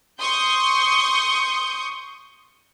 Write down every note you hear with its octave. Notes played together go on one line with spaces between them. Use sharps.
C6 C#6 D#6 G6